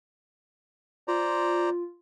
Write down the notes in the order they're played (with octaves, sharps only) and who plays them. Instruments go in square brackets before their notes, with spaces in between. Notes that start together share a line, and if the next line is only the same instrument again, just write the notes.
[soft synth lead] F4 [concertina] C5 D5 A#5